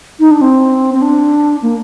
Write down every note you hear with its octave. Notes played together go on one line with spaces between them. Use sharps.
D#4
D4
C4
C4
D4
A#3